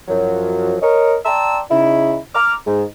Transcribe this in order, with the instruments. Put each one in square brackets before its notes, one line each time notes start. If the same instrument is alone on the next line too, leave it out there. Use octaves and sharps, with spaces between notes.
[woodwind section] F#2 F3 F#3
A#4 C#5 D#5
D5 G5 A5 A#5 C6 E6
C#3 D#4 E4
A#5 D6 F6
G#2